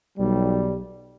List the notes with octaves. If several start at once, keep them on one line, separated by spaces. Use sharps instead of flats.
B1 G3